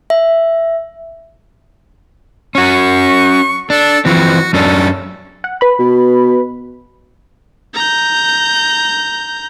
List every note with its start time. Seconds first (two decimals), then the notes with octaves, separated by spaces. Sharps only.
0.10 E5
2.55 C#4 F#4 C#6
3.70 D4 A4
4.05 E3 F3 C4 F#4
4.53 F#2 C#4 D4 A4
5.44 F#5
5.61 B4 B5
5.79 B2
7.74 A#5 G6